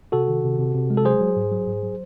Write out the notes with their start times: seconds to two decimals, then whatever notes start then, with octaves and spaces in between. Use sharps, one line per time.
0.12 C3 F#4 A4
0.28 D#3
0.44 C3
0.59 C3
0.75 C3
0.90 G#3
0.97 A4
1.05 F#3 G#4 C5
1.21 F#3
1.36 G#2
1.52 F#3
1.67 G#2
1.83 F#3